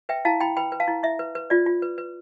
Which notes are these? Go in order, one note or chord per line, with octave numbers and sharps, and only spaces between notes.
B4 E5 G5
E4 F5 A5
E4 G5 B5
B4 G5 B5
B4
F5 A5
E4
E4 E5
B4
B4
F4 D5
F4
B4
B4